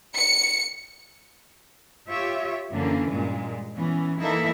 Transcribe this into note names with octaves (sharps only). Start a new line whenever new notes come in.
C#7
F4 G4 C#5 E5
F#2 D3 E3 A#3 C#4
G2 A#2 G#3
E3 B3 C#4
E3 A#3 D#4 E4 A4 E5